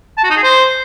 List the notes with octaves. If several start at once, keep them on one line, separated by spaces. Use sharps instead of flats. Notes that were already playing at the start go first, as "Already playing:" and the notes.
A5
F#4
D#4
G#4
C5